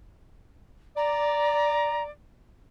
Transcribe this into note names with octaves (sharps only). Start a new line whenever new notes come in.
D5 A#5